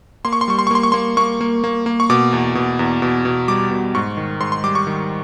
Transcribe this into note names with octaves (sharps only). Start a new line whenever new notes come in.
A#3 C6
C#6
C6
G3 C#6
C6
C#6
A#3 C6
C#6
A#3 C6
A#3 C#6
A#3
A#3
A#3
C#6
B2 D6
E2
B2
E2
B2
B2
G3 D6
B2
G#2 C#6
D#3
G#2 C6
C6
G3 D6
C#6
D#3